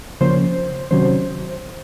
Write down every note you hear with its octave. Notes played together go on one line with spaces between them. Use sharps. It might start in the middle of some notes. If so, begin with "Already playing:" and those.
C#3 F3 A#3 C#4 C5
C3 D#3 F#3 C#4 C5